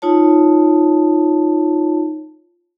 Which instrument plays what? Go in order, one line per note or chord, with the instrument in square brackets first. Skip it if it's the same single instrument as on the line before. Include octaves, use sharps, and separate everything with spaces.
[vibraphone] D#4 F4 C#5 A5